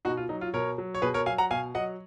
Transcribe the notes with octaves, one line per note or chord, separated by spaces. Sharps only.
B2 D#4 F#4
F4
F#3 D#4
F4
B2 A#4 C#5
F#3
C#5
B2 G#4 B4
A#4 C#5
F#3 F5 G#5
F#5 A#5
B2 F5 G#5
F#3 D#5 F#5